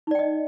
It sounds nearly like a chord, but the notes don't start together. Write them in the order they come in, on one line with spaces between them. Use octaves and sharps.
D#4 D5 G5 D#5